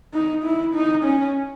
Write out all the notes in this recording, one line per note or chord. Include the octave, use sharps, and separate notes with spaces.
D#4
E4
D#4
C#4